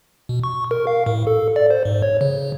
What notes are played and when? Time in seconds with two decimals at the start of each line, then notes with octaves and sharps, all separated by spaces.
0.29 B2
0.44 C#6
0.71 A#4
0.87 F5
1.06 A2
1.27 A4
1.56 D5
1.71 C5
1.85 G#2
2.02 C#5
2.21 C#3
2.34 C#3